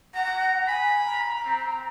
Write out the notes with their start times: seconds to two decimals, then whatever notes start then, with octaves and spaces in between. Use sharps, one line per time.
0.15 F#5 A#5
0.67 G#5 B5
1.06 A#5
1.45 C4